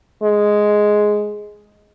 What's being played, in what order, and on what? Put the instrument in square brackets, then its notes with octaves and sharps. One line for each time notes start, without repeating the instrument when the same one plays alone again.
[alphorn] G#3